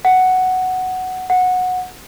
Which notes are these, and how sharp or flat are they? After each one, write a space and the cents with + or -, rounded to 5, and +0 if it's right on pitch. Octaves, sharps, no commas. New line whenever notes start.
F#5 +5
F#5 -15